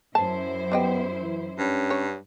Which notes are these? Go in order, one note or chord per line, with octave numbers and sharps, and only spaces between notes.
F#2 E4 C5 A5
G3 B3 D#5 G5
E3
G2 C#4
C#5